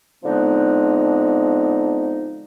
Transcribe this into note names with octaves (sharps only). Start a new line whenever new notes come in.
D3 F3 G#3 B3 C4 D#4